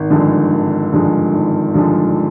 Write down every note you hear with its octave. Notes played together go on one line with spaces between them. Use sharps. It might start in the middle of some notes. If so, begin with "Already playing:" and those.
Already playing: G#1
G2 D3 F3 G#3
G#1
G2 D3 F3 G#3
G#1
G2 D3 F3 G#3